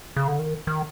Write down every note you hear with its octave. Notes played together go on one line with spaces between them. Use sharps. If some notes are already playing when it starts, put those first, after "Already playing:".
C#3
D3
D#3
D#3